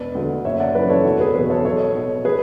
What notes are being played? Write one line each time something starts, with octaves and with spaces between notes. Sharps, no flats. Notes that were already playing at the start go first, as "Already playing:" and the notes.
Already playing: E1 B4 D5
D2 D3
F#1 C#5 E5
D5 F#5
F#2 E3 B4 D5
A4 C#5
E1 F#4 A4
G#4 B4
E2 B2 G#4 B4
A4 C#5
B1 A4 C#5
B2
G#4 B4